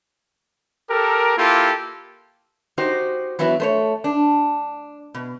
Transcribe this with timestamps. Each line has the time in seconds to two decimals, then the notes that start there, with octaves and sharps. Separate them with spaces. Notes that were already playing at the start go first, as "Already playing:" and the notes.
0.90 G4 A4 A#4
1.37 A#3 E4 F4 G4 A4
2.78 D#4 F#4 G4 C5
3.39 E3 F#3 B3 E4 F#4
3.60 A3 C5 C#5
4.04 D4
5.15 B2